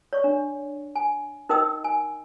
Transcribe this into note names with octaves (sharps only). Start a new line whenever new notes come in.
C#5 D5 C#6
D4
G#5
D#4 A#4 D#5 G5 D#6 E6
G#5